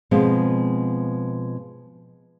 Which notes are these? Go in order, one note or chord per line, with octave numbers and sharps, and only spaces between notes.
B2 F3 G#3 B3 C4